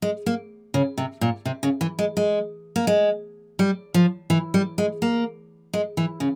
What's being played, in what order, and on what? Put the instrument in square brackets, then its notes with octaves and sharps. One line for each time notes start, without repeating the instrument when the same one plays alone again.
[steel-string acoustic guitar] G#3
A#3
C#3
C3
A#2
C3
C#3
E3
G#3
G#3
A#3
G#3
G3
F3
E3
G3
G#3
A#3
G#3
E3
C#3